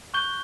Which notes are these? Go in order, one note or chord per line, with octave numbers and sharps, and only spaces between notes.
C#6 F#6 G6 G7